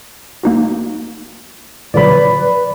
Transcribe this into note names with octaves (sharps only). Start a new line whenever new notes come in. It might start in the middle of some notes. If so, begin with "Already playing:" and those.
A#3 D#4 F#4
A#2 D3 F#3 B4 D5 B5